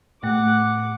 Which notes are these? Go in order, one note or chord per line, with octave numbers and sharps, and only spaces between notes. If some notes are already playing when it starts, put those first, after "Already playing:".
A2 A3 F#5 D6